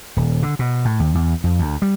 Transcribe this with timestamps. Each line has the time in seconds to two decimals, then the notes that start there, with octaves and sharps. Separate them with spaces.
0.17 D#1
0.43 D3
0.59 B2
0.85 A2
1.00 D#2
1.15 E2
1.44 F2
1.59 D2
1.82 G3